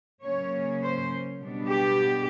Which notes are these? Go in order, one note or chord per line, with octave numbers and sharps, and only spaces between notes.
C#3 F#3 A#3 C#4 C#5
C5
B2 G3 B3 D4
G4